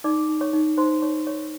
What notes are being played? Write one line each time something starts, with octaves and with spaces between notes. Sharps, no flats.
D#4 D5 D6
D#4
C#5 C#6
D#4
D#4 C5 C6
D#4 C#5 C#6
C#5 C#6